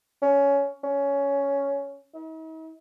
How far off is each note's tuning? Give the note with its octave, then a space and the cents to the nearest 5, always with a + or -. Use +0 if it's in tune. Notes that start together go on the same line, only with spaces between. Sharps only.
C#4 +15
C#4 +10
D#4 +45